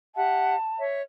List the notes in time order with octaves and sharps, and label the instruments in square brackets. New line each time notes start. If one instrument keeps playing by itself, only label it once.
[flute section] G4 E5 F#5 [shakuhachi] A5
[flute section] C#5 E5